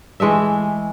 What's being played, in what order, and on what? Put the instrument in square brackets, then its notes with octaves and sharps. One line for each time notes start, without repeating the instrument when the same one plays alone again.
[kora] E3 G#3 A3 E5